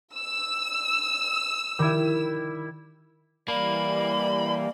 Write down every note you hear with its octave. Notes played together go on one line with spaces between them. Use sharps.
E6
D#3 G3 E4
E3 G3 A#3 D5 B5